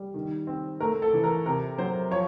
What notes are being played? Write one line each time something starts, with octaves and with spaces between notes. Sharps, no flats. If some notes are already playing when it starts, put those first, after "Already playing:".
Already playing: G3
D#3
C4
A3 A#4
A4
E3
A#4
C3 A#4
F#3 C5
F3 C#5